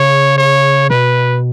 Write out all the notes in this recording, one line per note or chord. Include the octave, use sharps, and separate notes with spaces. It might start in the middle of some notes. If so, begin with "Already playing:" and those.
Already playing: C#3 C#5
C#5
B2 B4